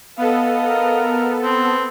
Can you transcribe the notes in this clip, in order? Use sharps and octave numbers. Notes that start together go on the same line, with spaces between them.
B3 A4 D#5 F5
A#4
C4